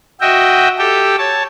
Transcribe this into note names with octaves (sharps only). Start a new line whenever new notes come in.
F#4 D#5 E5 G5
G4 A4 G5
C#5 A5